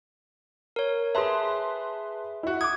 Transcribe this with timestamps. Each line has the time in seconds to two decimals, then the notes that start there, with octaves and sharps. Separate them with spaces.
0.76 A#4 C#5
1.15 G#4 B4 E5 A5 C6
2.43 E4 F#4
2.61 D6 D#6 G#6